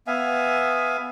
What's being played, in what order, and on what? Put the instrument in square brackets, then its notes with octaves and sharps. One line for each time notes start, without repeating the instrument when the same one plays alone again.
[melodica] B3 E5 F5 G#5